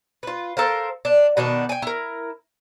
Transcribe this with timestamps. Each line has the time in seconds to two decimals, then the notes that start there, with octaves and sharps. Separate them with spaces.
0.23 F4 B4
0.57 A4 A#4 C5 F5
1.05 D4
1.37 B2 D#3 B3 D4
1.69 G5 G#5
1.82 E4 A#4